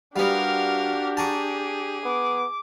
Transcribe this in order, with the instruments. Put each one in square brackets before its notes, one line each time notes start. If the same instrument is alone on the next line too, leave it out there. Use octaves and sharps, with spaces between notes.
[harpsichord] G3 B3 [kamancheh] D4 G4 [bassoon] F#4 [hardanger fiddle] A#4 F5
[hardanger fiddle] G#4 [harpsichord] A5 A#5 C#6
[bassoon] B3 [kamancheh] D6